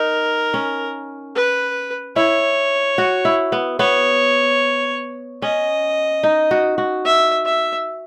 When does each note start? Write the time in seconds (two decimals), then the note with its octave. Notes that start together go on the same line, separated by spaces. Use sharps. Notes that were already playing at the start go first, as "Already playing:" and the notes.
Already playing: D#4 A#4
0.54 C#4
1.35 B4
2.16 E4 C#5
2.98 F#4
3.25 E4
3.52 B3
3.79 B3 C#5
5.42 C#4 D#5
6.23 D#4
6.51 F#4
6.78 F#4
7.05 E5
7.45 E5